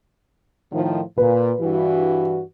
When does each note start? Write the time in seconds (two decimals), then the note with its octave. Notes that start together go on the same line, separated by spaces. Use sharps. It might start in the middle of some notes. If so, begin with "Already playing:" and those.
0.72 A2 D#3 F3
1.18 A#2 B4
1.60 G2 E3 F#4